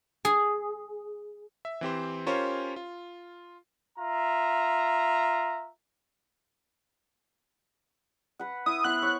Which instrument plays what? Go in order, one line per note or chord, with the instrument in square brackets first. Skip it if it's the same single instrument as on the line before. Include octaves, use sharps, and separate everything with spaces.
[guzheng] G#4
[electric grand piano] E5
E3 C4 G4 C5
C#4 F4 G4 A#4 C5 C#5
F4
[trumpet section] F4 E5 A#5
[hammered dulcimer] B4 F#5
[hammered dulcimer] E4 [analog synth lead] D#6
[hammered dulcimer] B3 E4 C5 [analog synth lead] F#6
[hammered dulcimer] E4 C#5